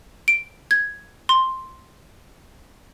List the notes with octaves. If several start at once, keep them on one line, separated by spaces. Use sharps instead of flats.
D7
G#6
C6